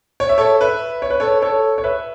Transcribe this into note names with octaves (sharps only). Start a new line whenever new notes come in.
C#5
E5
A4 C#5
B4 E5
C#5
B4
A4 C#5
A4 C#5
C#5
B4 E5